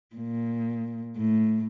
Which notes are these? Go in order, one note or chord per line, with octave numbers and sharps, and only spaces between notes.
A#2
A2